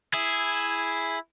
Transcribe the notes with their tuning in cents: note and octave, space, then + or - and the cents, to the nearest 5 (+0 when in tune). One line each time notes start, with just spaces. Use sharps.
E4 +0 G#4 +0